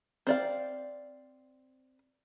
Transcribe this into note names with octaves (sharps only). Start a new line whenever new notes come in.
C4 D5 F5